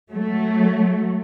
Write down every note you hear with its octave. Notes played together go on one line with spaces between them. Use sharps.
F#3 A3